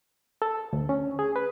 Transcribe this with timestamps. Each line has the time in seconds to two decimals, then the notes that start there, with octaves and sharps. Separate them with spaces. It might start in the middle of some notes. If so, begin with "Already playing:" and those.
0.42 A4
0.73 D2
0.89 C#4
1.19 G#4
1.36 B4